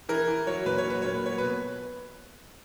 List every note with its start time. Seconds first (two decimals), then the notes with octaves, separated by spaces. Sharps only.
0.09 E3 A#4
0.27 E3
0.47 F#3 C#5
0.66 A#2 B4
0.78 C#5
0.85 F#3 B4
1.02 A#2 C#5
1.14 B4
1.24 F#3 C#5
1.38 B2 B4